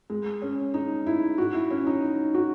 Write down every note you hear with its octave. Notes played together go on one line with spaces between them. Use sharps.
G#3
C#4
D#4
E4
F#4
E4
C#4
D#4
F#4